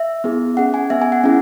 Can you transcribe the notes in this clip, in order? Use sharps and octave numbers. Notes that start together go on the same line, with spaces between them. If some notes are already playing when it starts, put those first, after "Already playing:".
Already playing: E5
B3 E4 G#4
C#4 G#4 F#5
G#5
B3 G#4 E5
G#5
F#5
C#4 E4 G#4 E5